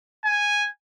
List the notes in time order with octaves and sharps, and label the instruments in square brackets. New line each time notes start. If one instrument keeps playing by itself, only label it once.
[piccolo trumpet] G#5